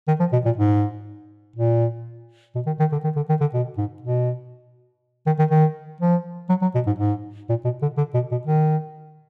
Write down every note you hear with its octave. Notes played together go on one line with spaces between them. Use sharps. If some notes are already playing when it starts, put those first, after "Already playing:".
D#3
F3
B2
A#2
G#2
A#2
B2
D#3
D#3
D3
D#3
D3
D#3
D3
B2
G#2
B2
D#3
D#3
D#3
F3
F#3
F#3
B2
G#2
G#2
A#2
B2
D3
D3
B2
B2
D#3